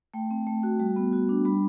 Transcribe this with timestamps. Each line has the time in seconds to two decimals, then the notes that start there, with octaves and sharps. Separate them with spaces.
0.14 A3 G5
0.31 C4
0.47 A3
0.63 F#4
0.80 G3
0.96 B3
1.13 F#4
1.29 D4
1.45 G3 B5